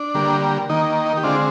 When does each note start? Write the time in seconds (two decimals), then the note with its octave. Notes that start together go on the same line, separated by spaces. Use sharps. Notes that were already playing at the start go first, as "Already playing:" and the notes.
Already playing: D4
0.14 D3 G3 A#3
0.69 D#3 A#3 D#4
1.06 D#4
1.17 G4
1.23 D3 G#3 C4 D4 F4